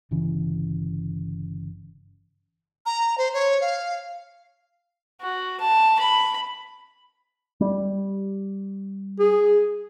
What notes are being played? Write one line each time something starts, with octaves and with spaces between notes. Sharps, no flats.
G1 C#3 E3
A#5
C5
C#5
F5
F#4
A5
B5
G3
G#4